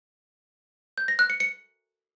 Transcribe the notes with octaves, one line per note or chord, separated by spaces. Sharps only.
G6
A#6
F#6
C#7
C#7